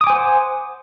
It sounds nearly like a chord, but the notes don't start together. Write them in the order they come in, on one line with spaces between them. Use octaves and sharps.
D#6 D6 G#5 C5 F#5